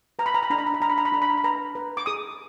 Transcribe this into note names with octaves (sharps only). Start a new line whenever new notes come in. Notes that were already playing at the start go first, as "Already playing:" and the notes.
B4 A#5
B5
A#5
B5
D4 A#5
B5
A#5
B5
D4 A#5
B5
A#5
B5
D4 A#5
B5
A#5
B5
B4 A#5
B4
D6
G#4 D#6